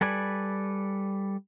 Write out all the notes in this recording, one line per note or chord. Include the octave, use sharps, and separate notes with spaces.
G3 A4 B4 D5 G#5